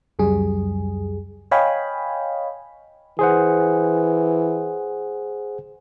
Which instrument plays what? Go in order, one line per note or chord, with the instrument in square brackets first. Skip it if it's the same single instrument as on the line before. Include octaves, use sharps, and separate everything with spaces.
[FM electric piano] C#2 F#2 G3 G#4
C#5 D#5 F5 G5 G#5 B5
[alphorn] E3 [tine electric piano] G#4 C5 F#5